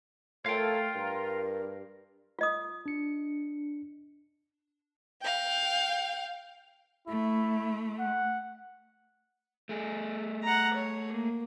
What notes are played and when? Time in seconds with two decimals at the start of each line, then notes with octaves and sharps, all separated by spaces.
0.46 A3 F4 A4 A#4 C#5 F5 G5
0.95 G2 A#4
2.39 F4 D#5 D#6
2.86 D4 C#7
5.22 F5 G5
7.08 A3 E4
7.99 F#5
9.69 A3 G#4
10.43 F#5 A#5
10.74 C#5
11.12 A#3